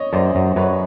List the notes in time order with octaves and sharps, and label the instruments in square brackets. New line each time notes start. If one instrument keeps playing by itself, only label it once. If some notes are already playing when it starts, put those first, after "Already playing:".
Already playing: [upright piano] C#5 D#5
[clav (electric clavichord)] F#2 [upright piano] C5 D5
[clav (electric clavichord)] F#2
[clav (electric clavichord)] F#2 [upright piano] B4 C#5